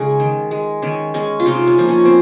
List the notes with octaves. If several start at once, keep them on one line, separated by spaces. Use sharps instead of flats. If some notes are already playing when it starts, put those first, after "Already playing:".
Already playing: C#3 G#3 D#4 G#4
D#3
G#3
D#3 C#4
G#3 C#4
F4
C3 D#4
C#4
F3 A#3
C#4
C4